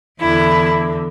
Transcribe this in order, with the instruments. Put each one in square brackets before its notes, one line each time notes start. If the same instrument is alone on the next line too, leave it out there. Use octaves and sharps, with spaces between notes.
[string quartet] E2 D3 E4